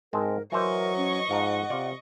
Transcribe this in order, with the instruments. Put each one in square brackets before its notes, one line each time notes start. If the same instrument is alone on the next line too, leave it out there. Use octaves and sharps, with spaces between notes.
[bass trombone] G#2 [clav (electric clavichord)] G#3 C4 A5 [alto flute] A#4
[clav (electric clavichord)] E3 C5 [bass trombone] F#3 [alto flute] A#4 [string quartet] D#5 C#6
[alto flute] C#4
[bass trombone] G#2 [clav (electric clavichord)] F3 F4 A#5 [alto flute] F#5
[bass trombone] C3 [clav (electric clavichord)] F4 D5